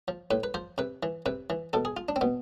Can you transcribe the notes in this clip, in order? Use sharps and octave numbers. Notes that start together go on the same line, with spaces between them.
F3
A2 B4
B4
F3 C5
C3 B4
E3
C3 B4
E3
B2 A4
G#4
F4
D4
C4
B2 B3